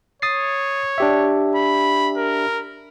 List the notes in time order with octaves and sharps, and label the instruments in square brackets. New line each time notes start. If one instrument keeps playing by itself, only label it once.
[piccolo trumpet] C#5 [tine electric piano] D#6 A6 C7
[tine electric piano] D4 G4 E5
[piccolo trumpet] B5
A#4